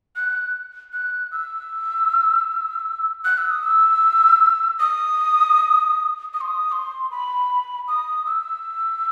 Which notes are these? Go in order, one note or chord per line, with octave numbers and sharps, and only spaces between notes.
F#6
F#6
E6
F#6
E6
D#6
E6
D#6
D#6
C6
D#6
C6
B5
D#6
E6